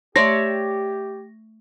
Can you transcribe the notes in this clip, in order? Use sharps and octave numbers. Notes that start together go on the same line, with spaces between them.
A3 G4 C#5 D5 E5 C6 A#6